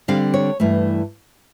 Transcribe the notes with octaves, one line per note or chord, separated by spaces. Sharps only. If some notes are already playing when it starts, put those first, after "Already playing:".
D3 G3 C4 F5
C#5
G2 E3 A3